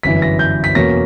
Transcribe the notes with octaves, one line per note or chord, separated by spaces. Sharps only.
G1 F#2 E3 B6
A#6
G6
B6
E2 B2 A#3 C#4 A#6